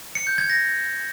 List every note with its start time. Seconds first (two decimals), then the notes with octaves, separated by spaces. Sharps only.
0.15 C#7
0.27 G6
0.38 G#6
0.50 A#6